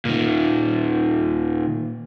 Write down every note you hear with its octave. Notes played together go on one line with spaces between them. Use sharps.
A#2 D#3